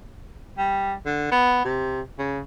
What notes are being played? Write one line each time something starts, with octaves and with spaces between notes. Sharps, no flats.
G3
D3
B3
C3
C#3